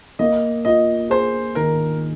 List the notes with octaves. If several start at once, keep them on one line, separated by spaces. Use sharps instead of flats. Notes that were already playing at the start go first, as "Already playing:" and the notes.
A#3 D#5
F4 D#5
G#4 C5
D#3 A#4